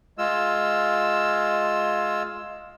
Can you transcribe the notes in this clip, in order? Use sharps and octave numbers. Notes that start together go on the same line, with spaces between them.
G#3 F4 E6